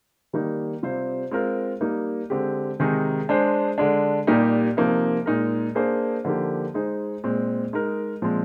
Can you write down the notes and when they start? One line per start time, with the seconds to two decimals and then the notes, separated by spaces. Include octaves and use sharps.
0.33 D#3 G3 A#3 D#4
0.83 C3 G3 C4 F4 C5
1.31 G#3 C4 F4 A#4
1.81 G3 A#3 D#4
2.30 D3 G#3 C4 G4
2.80 C3 D#3 G#3 D#4 G#4
3.29 G#3 D4 G#4 C5
3.78 D3 G#3 D4
4.27 A#2 G3 A#3 D#4 G4
4.77 C3 F3 A#3 D#4
5.26 A#2 G#3 D#4 A#4
5.75 A#3 D4 G#4 C5
6.25 D3 F3 A#3 D#4 G4
6.74 G#3 D#4 G#4 C5
7.24 A#2 G#3 C4
7.73 G#3 D#4 A#4
8.22 A#2 F3 G#3 C4